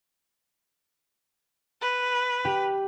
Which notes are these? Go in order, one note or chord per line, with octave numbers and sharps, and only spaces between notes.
B4
G4